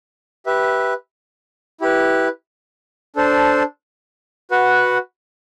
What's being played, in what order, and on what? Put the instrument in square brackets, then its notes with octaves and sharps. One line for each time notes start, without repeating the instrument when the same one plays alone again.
[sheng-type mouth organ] G4 B4 E5
E4 G4 B4
D4 A4 C5
F#4 B4 F#5